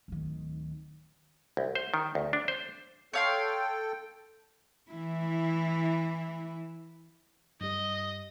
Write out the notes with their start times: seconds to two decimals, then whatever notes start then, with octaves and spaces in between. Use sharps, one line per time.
0.08 D1 D#3
1.57 C2
1.75 C5
1.94 D#3
2.15 D2
2.33 D4
2.48 C5
3.13 A4 C#5 F5 G5 C6
4.91 E3 E4
7.61 G2 G3 D#5